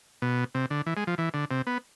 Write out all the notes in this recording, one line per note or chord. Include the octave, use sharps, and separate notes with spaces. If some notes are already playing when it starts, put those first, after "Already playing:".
B2
C3
D3
E3
G#3
F3
E3
D3
C3
B3